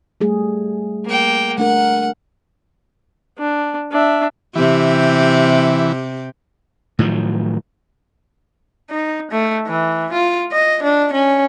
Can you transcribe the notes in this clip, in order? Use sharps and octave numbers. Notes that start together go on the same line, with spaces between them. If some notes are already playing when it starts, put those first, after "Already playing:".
G3 A3 G#4
A#3 G5
A3 D4 A#4 F#5
D4
D4 E5
C3 E3 G4
A2 D#3 F3 F#3
D#4
A3
E3
F4
D#5
D4
C#4